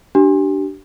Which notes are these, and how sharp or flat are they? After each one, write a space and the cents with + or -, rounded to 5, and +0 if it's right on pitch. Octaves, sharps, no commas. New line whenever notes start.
D4 +0 G4 -35